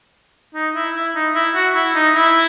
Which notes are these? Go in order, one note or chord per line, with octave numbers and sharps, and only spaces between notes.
D#4
E4
E4
D#4
E4
F#4
E4
D#4
E4